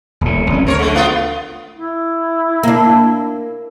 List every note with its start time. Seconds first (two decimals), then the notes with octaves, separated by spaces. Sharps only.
0.21 D#1 A2
0.50 G#1 F#3 C#4
0.67 D2 A#4 C5 C#5
0.79 D3 G#3
0.95 A3 B3 F4
1.76 E4
2.63 A#3 D4